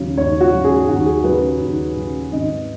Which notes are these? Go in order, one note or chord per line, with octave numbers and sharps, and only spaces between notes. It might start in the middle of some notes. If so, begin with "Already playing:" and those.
Already playing: D#2 C#3 F#3
D#2 C#5
F#4
C#3 F#3
G#4
D#2 F#4
G#4
C#3 F#3 B4
D#2
C#3 F#3
G#1 D#5